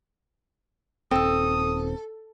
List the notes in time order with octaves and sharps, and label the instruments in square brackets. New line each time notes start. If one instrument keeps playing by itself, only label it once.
[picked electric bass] D#1 C4 [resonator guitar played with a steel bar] A4 [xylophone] G5 E6 [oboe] D#6